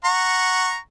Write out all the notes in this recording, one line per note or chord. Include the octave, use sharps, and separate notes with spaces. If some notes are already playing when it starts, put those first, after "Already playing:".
F#5 A#5 C#6